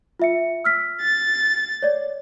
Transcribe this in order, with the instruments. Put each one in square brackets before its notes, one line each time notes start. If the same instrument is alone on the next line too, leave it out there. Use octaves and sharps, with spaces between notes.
[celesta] F4 E5 C#7
E6 F6 B6
[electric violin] A6
[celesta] C#5 D5